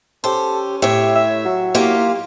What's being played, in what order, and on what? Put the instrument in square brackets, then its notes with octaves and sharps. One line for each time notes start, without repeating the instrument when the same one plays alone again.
[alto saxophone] C#4 [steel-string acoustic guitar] G4 C5 [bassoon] A4
[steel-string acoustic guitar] A2 C#5 [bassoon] G4 [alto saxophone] E5
[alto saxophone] E5
[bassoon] F#3
[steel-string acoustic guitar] A#3 F4 G4 [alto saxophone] E4